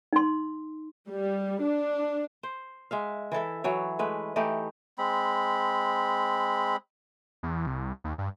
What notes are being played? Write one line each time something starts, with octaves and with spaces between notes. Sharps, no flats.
D#4 C6
G3
D4
C5
G#3 E5 F5
E3 E4 A4 E5
E3 F#3 C#5
G#3 A3 B4
E3 A3 D#4 G4
G#3 C4 B5
E2
C2
D#2
G2